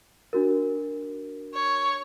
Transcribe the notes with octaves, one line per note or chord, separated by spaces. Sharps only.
D4 F#4 A#4
C#5